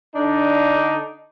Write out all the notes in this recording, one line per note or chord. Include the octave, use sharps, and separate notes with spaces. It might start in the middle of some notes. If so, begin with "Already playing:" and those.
D3 D4 D#4